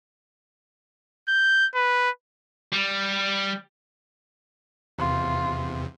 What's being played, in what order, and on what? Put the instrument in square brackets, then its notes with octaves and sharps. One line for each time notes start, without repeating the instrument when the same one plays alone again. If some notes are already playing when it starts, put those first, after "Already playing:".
[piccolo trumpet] G6
B4
[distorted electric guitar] G3
[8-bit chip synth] E2 C3 [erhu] F4